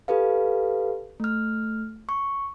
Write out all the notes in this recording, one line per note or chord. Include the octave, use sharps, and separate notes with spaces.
G4 A4 B4 F5
A3 F6
C#6